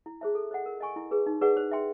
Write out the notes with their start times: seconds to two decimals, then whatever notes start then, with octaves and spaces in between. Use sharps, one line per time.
0.06 E4
0.21 G#4 C5 E5 A5
0.35 A4
0.51 C5 D#5 F#5
0.66 A#4
0.81 D#5 G#5 C#6
0.96 E4
1.11 G#4 B4
1.26 D#4
1.41 G#4 B4 D5 F#5
1.57 C5
1.71 E5 G5 C6